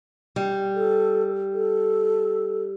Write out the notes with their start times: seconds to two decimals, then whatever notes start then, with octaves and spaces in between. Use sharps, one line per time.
0.36 G3
0.75 A4
1.53 A4